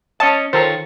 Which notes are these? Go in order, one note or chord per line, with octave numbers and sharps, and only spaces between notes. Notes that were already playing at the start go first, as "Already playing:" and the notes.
C#4 C#5 D#5 A5
D#3 F4 A4 A#4 C5 C#5